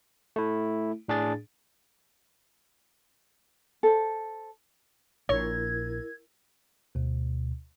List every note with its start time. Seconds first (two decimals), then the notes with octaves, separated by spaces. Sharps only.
0.36 A3 E4
1.08 A2 D4 G#4 A6
3.83 A4 C5
5.29 A#1 A#2 E4 A#4 C#5 G#6
6.95 D2 B2